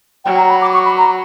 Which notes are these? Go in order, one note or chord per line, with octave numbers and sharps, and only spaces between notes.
F#3 G5
A#5
B5
D6
C#6
B5
A#5